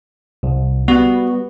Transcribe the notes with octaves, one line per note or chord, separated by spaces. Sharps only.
C2
G3 B3 F#4